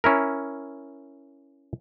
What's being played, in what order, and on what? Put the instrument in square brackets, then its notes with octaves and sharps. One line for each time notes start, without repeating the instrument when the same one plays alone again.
[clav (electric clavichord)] C#4 E4 A#4